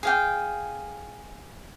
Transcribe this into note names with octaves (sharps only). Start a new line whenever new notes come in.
G#4 F5 G5